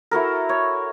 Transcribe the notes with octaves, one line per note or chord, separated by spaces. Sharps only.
E4 F#4 A4 A#4
C#5